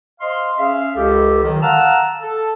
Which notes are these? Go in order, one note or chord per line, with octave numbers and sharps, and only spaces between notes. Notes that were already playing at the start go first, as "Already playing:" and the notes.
C5 D#5 F5 C6
C#4 G#4 E5 F5
C#2 G4 A4
D#3 F#3
F5 F#5 A5 A#5 E6 F6
A4